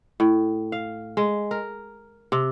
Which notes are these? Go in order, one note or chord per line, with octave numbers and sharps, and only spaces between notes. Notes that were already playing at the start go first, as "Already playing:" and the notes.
A2
F5
G#3
A#4
C3